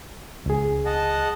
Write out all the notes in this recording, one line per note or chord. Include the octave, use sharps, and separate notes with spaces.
C#2 G#4
D#5 F#5 A5